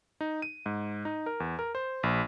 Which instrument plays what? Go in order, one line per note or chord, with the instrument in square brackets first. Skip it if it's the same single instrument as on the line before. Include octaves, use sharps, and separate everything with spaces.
[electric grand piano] D#4
D#7
G#2
D#4
A#4
E2
A#4
C5
A#1